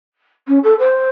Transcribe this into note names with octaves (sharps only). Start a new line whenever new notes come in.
C#4
A4
C5